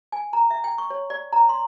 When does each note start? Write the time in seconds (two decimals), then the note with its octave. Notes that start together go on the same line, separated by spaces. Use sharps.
0.12 G#5
0.33 A#5
0.51 E5
0.64 G5
0.78 C#6
0.90 C#5
1.10 D5
1.33 A#5
1.49 C6